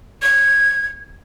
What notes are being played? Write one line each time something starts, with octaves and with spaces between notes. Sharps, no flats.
G#6